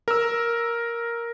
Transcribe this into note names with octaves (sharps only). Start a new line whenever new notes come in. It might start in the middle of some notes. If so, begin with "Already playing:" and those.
A#4 E6